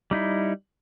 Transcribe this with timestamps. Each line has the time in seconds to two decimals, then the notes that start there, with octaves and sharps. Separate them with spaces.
0.11 G3 D#4 E4